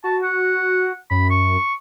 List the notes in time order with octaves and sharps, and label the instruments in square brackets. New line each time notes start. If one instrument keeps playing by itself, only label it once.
[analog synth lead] F#4 [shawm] A5
[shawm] F#5
[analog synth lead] F#2 [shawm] B5
[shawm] C#6